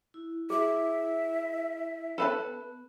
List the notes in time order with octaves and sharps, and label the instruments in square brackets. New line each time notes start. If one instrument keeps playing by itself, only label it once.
[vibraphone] E4
[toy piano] G#4 [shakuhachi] E5
[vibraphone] B3 [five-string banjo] A4 B4 A5